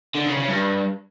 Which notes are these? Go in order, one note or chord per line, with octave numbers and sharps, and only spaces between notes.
D3
C#3
C#3
G2